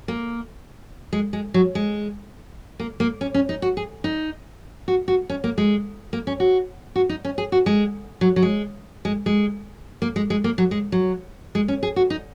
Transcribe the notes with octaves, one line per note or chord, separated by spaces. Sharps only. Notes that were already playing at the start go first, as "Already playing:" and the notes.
A#3
G#3
G#3
F#3
G#3
A#3
A#3
C#4
C#4
D#4
F#4
G#4
D#4
F#4
F#4
C#4
A#3
G#3
A#3
C#4
F#4
F#4
D#4
C#4
G#4
F#4
G#3
F#3
F#3
G#3
G#3
G#3
A#3
G#3
G#3
A#3
F#3
G#3
F#3
G#3
C#4
G#4
F#4
D#4